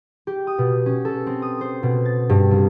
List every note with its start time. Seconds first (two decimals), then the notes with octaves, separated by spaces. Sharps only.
0.27 G4
0.47 D#6
0.58 B2
0.86 C#4
1.05 A4
1.27 C4
1.42 D#6
1.61 C5
1.83 B2
2.05 A6
2.29 G2
2.51 C2